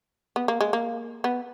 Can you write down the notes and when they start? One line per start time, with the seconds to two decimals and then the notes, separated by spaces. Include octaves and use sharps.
0.36 B3
0.48 A#3
0.61 G#3
0.73 A#3
1.24 B3